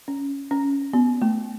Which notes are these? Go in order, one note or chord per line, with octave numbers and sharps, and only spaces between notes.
C#4
C#4
B3
A3